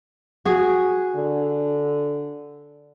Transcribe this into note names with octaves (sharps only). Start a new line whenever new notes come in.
F#4 G#4
D3